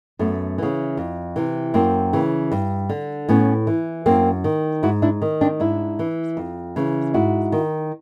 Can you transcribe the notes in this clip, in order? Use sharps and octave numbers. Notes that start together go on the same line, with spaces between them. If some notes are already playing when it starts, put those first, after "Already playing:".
F#2 A3 B3
C#3 E3
F2
C3 E3
F#2 A#3 C4
C#3 E3
G2
D3
A2 B3 C#4
E3
F#2 A#3 C4
D#3
G#2 E4 F#4
D4 E4
D#3
C4 D4
G#2 D4 E4
E3
F2
C#3 E3
G#2 E4 F#4
D#3